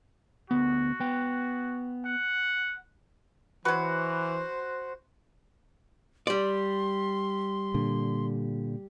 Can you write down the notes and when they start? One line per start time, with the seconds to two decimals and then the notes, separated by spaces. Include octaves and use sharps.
0.51 D2 B3 F#4
1.00 B3 G5
2.06 F#5
3.65 E3 F#3 F#4 B4 C5
6.27 G3 D5 C6
7.74 A#2 D3